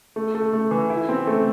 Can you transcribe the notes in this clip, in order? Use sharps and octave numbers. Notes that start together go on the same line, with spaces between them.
A3
A3
A3
E3
E4
C4
A3